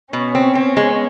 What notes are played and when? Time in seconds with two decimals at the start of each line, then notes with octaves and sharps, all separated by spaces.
0.13 B2 B3 C#4
0.35 C4
0.55 C4
0.77 G#3